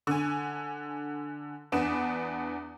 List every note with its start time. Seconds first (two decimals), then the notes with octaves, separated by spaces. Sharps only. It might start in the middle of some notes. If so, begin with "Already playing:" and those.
0.07 D3 G#5
1.72 E2 B3 D4 E7